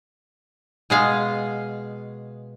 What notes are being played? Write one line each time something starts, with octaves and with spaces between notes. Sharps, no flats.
B2 G#3 F5